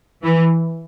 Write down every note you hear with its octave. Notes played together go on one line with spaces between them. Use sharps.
E3